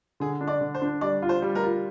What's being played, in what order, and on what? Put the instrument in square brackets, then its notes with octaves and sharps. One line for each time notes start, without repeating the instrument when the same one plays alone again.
[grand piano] D3 [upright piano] G#4
[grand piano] D4
[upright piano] D5
[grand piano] D3
[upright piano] C5
[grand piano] D4
[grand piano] G3 [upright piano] D5
[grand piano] F4
[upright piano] C5
[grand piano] G3
[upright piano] A#4
[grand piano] F4